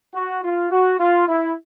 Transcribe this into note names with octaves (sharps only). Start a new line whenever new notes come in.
F#4
F4
F#4
F4
E4